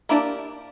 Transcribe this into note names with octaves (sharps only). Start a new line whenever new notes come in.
A#3 D4 E4 G4 D5